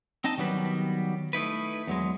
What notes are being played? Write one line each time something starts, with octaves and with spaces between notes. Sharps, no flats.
C4 D#4 D#5 A5
D#3 F#3 G3 B3 B4
A3 D#4 E4 B4
E2 F#3 G#3